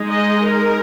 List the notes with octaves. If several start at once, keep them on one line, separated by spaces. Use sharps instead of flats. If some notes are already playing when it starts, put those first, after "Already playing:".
Already playing: G#3 D#4
D#5
A#4